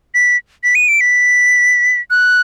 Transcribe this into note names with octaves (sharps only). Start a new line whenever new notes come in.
B6
B6
D#7
D7
B6
F#6